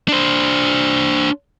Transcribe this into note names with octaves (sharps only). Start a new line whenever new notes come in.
D4 C5